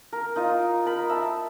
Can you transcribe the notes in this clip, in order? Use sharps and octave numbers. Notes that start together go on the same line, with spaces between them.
A#4
D#4 F4 D#5
A#4 B5
E5 A5